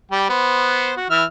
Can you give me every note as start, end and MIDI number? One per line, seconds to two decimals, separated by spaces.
0.12 0.25 55
0.12 0.25 79
0.30 0.94 59
0.30 0.94 72
0.97 1.10 66
1.10 1.24 52
1.10 1.24 76
1.10 1.24 89